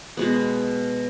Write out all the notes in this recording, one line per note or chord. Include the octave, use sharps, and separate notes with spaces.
B2 G#3 B3